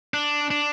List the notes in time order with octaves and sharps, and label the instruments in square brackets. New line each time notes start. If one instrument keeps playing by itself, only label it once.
[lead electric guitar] D4
D4